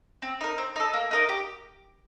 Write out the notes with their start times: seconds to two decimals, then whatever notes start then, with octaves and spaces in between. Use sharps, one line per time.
0.22 C4
0.41 D#4 A#4
0.58 C4
0.76 D#4 A4
0.93 A#3
1.11 D#4 A#4 D#5
1.29 G4